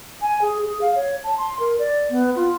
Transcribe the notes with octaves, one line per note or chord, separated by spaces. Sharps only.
G#5
G#4
G#4
F5
C#5
A5
C6
A#4
D5
B3
F4